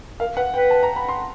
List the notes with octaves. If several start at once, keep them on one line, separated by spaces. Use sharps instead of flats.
A#4 F5
B4 F#5
B4 G5
A5
A#5
B5
C6